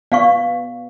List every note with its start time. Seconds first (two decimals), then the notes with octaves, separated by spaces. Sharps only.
0.12 B3 D5 F5 C#6